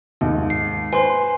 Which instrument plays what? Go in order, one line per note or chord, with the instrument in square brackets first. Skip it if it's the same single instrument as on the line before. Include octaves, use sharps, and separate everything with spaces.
[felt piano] D#2 G#2
[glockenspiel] C7
[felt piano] B4 C5 [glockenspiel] G#5 C6